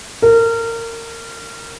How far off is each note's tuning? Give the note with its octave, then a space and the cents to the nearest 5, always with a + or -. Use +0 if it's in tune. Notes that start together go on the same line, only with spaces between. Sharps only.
A#4 -25